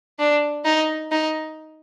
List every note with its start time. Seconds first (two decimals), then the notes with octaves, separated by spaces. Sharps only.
0.19 D4
0.65 D#4
1.12 D#4